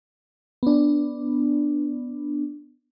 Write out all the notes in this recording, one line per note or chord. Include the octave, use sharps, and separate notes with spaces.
B3 D4